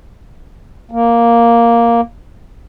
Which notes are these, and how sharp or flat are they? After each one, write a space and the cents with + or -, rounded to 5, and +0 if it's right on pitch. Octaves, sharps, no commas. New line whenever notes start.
A#3 +0